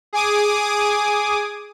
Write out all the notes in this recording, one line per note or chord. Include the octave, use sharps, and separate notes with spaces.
G#4 G#5 D6 D#6